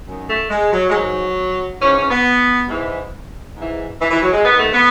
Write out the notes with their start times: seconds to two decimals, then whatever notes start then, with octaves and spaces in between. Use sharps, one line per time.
0.06 F#2 D#3
0.28 A3
0.50 G#3
0.72 F#3
0.89 G#3
0.93 G#2 D#3 F#3
1.81 G#2 E3 C#4
1.96 C#4
2.10 B3
2.69 G#2 E3
3.56 G#2 E3
4.01 E3
4.11 E3
4.22 F#3
4.33 G#3
4.44 D#2 D#3 B3
4.58 A3
4.73 B3